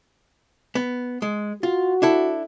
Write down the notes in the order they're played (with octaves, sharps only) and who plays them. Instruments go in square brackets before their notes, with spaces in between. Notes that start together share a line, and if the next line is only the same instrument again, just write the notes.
[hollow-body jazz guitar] B3
G#3
[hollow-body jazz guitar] F4 [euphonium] F#4
[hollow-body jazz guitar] D4 E4 A4